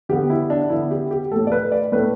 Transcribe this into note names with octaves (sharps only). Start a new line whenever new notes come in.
D3 B3 G4
E4
D4
D3 B3 E4
G4
G4
A2 A3 A4
D5
B4
D5
A2 A3 B4